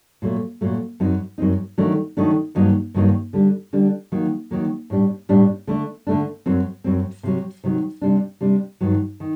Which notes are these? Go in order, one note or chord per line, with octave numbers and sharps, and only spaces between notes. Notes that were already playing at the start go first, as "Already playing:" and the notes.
A#2 F#3 A3
A#2 F#3 A3
F#2 F#3 C4 D#4
F#2 F#3 C4 D#4
D#3 F#3 A3 D4
D#3 F#3 A3 D4
G2 D#3 F#3 A#3 D#4
G2 D#3 F#3 A#3 D#4
D3 G3 D4
D3 G3 D4
D#3 F#3 A#3
D#3 F#3 A#3
A2 G3 D4
A2 G3 D4
D3 A3 D4
D3 A3 D4
F#2 F#3 C4
F#2 F#3 C4
C3 D#3 F#3
C3 D#3 F#3
C3 G3 D4
C3 G3 D4
G2 D#3 F#3
D#3